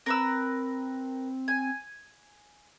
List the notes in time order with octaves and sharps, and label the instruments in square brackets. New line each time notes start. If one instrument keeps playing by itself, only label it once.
[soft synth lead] C4 [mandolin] A#4 B4 E6
[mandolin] G#5